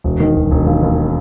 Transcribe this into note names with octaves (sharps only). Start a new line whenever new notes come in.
E1
D#3
E1
E1
D#2
D#2